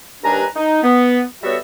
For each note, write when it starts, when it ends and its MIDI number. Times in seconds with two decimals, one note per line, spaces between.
0.24 0.45 39
0.24 0.45 55
0.24 0.45 62
0.24 0.45 71
0.24 0.45 80
0.24 0.45 82
0.56 0.82 63
0.83 1.21 59
1.44 1.56 55
1.44 1.56 59
1.44 1.56 66
1.44 1.56 69
1.44 1.56 73
1.44 1.56 76